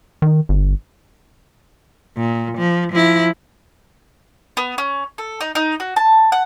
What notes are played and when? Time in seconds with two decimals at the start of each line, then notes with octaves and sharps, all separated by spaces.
0.22 D#3
0.49 G1
2.17 A#2
2.58 F3
2.93 F3 E4
4.57 B3
4.78 C#4
5.18 A4
5.41 D#4
5.55 D#4
5.80 F#4
5.96 A5
6.32 F#5